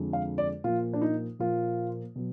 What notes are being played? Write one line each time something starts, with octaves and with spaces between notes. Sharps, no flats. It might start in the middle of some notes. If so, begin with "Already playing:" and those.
Already playing: F2 D3 G#3
F5
D5
A#2 F3 A#3 F4
D4
D#4
A#2 F3 A#3 F4
B2 F#3